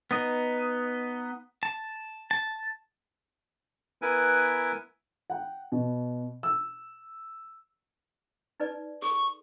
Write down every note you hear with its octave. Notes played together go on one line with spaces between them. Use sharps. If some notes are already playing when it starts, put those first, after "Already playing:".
B3 D#4 D#5
A5
A5
B3 E4 A#4 B4 G#5
F#5 G5
B2
E6
D#4 B4 D5
G#4 A4 C#6